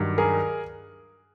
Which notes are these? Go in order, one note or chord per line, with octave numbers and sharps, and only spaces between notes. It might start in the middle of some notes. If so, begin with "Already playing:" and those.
Already playing: G2 D#3 F#3
G#4 A#4